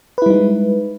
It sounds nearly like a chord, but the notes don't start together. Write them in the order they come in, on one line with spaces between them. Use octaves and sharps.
B4 E4 G3 D#4 G#3